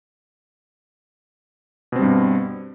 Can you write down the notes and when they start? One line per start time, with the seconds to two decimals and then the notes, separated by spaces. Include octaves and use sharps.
1.92 B2
1.96 C4
1.99 G3
2.02 G2